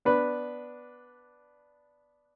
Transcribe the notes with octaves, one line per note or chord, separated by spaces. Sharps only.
B3 D4 B4